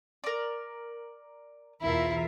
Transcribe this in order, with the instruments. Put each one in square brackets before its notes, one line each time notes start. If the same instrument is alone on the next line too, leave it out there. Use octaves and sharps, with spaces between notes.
[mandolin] A#4 D5
[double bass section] B1 E2 [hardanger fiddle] E4 [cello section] F4 A#4 E5